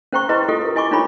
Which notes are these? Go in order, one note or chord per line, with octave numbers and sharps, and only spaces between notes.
C#4 C5 G5 A#5 C#6
E4 G#4 B4 D#5 A#5 C6
F4 G4 A4 D#5
A#4 D#5
E4 D#5 G#5 B5 C#6 D6
D4 D#4 F4 C#5 A#5 B5